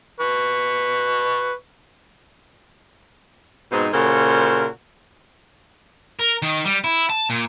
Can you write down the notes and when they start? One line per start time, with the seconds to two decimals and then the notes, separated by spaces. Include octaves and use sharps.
0.20 B4 C#6
3.72 G#2 B2 C4 D#4
3.93 A#2 C#3 F#4 A4 A#4 C5
6.19 A#4
6.42 D#3
6.65 G3
6.84 E4
7.10 A5
7.30 A#2